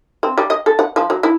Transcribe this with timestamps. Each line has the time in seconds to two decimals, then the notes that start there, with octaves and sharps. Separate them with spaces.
0.23 C4
0.38 G3
0.50 D#5
0.66 A4
0.79 F#5
0.96 F3
1.10 F#3
1.23 E4